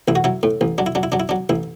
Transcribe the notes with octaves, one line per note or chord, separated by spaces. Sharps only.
A1 E4
F#4
F#3 E4
A2
A1
F#3 D4
E4
F#3 D4
E4
F#3 D4
E4
F#3 D4
A1 E4